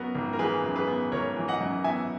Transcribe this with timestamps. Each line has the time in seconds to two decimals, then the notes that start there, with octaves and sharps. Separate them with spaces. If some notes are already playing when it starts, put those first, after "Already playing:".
Already playing: F#2 B3 F#4 A#4
0.15 G#1
0.33 A#4
0.39 E3 G#4 B4
0.64 F#2
0.75 G#4 B4
0.88 B3
1.12 G#1 A#4 C#5
1.37 E3
1.48 D#5 F#5
1.61 F#2
1.84 B3 E5 G#5